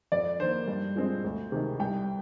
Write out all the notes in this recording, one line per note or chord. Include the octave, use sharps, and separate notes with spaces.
F2 D5
D#3 A#3 C5
G2
F3 G#3 C4
D2
C3 D#3 G#3
C2 G5